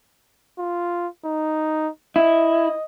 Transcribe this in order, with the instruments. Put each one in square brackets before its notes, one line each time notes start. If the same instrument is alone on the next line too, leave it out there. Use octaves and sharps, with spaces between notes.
[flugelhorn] F4
D#4
[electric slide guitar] E4 [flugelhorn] D#5